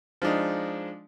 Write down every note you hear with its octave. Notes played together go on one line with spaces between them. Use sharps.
F3 G#3 D4 D#4